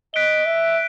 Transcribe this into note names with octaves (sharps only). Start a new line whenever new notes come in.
D#5 F#6 B6 D7 G7
E5